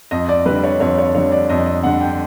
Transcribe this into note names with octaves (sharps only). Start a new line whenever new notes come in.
F2 D#5
D5
D3 G3 B4
C#5
F2 C#5
C#5
D3 G3 C#5
D5
F2 D#5
D#5
D3 G3 F#5
G5